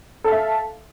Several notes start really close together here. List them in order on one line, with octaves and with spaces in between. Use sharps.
A4 F5 E5